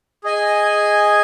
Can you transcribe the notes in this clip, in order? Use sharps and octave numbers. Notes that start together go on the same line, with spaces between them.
G#4 D#5 G#5